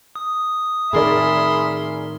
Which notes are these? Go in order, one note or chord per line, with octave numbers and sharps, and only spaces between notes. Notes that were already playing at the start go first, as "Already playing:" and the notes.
D#6
A2 D#3 G#4 A#4 D5 E5 B5 C6